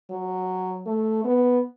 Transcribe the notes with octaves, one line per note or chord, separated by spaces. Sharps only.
F#3
A3
B3